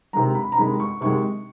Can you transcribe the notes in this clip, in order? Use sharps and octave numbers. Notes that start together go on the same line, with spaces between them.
C3 D#3 G#3 A#5
B5
A#5
C3 D#3 G#3 B5
C#6
C3 D#3 G#3 C#6